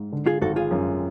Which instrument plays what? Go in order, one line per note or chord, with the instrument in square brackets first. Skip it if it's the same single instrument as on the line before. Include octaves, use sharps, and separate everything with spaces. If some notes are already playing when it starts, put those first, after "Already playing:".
Already playing: [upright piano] G#2
D3
[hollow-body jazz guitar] F4 G#4
[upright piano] G#1 [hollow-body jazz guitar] F#4 A4
[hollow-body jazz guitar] F4 G#4
[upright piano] F#2